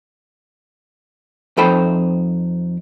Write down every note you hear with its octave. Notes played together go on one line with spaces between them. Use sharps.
F2 D#4 A4 C5 G5 B5